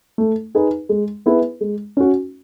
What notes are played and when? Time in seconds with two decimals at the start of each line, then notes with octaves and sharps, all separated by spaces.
0.18 A3
0.55 D#4 G#4 B4
0.89 G#3
1.26 B3 E4 G#4 B4
1.61 G#3
1.97 C#4 F#4